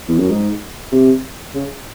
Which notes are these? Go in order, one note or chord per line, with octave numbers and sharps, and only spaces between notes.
E2
F#2
G#2
C3
C#3